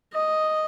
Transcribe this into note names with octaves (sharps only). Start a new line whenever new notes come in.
D#5